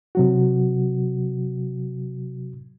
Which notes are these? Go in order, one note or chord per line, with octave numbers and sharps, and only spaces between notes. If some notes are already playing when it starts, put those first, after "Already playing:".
C3 F#3 F#4